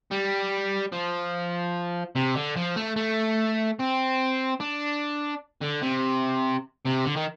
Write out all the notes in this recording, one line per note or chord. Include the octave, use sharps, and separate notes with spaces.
G3
F3
C3
D3
F3
A3
A3
C4
D4
D3
C3
C3
D3
D#3